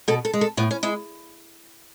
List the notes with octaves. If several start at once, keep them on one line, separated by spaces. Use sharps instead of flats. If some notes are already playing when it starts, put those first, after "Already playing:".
B2 A4
A4
G#3
A4
A2 B3
C#4
G#3 E4